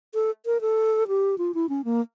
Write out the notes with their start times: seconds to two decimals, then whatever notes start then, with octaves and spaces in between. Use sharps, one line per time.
0.14 A4
0.46 A#4
0.61 A4
1.08 G4
1.38 F4
1.54 E4
1.69 C#4
1.85 A#3